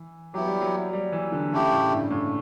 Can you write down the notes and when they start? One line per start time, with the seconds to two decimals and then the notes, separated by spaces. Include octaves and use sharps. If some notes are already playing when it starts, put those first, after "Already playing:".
Already playing: E3
0.34 F#3 B3 E4 G4
0.47 G3
0.61 F#3
0.93 G3
1.12 E3
1.32 D3
1.52 C#3 A3 E4 G4
1.72 A2
1.91 G2
2.10 A2